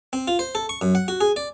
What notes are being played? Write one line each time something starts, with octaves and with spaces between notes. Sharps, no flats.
C4
F4
C5
A4
C#6
F#2
F#5
F#4
G#4
D5